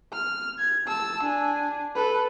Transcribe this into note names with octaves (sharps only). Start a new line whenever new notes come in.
F6
G#6
A5 E6
D4 G#5
A4 B4